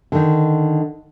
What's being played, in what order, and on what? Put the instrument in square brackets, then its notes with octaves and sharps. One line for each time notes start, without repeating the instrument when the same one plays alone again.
[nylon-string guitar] D3 D#3